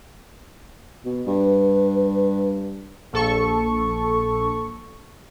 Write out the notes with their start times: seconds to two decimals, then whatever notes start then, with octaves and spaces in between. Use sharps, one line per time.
1.05 B2
1.27 G2 B4
3.13 A#1 A4 C#6